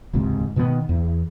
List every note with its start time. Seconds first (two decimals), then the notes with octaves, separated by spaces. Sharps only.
0.13 D#1 C#2 G#2 C3
0.56 B2 D#3 F3 B3
0.89 E2